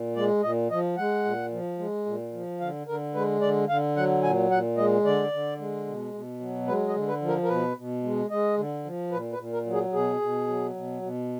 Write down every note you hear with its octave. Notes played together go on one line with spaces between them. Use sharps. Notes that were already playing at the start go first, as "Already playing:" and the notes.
Already playing: A#2
G#3 D5
A#2 D#5
F3 D#5
G#3 F#5
A#2
F3
G#3
A#2
F3
D3 F5
D3 A#4
G#3 B4
D3 D5
D3 F5
F#3 F#5
A#2 G#5
A#2 F#5
G#3 D#5
D3 D5
D3
G#3
B2
B2
F#3
G#3 B4
D#5
D3
B4
F3
A#4
A#4
B2 B4
B2
G#3
G#3 D#5
D3
F3
A#2 B4
B4
A#2
A#4
F#3
G#4
B2 G#4
B2
F#3
B2
B2